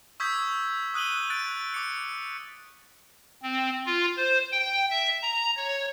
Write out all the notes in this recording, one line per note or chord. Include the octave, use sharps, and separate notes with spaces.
C#6 D#6 E6 G6 G#6 B6
D#6 F#6 D#7 F#7 G7
F#6 A6 D7
D6 C#7
C4
F4
C5
G5
E5
A#5
C#5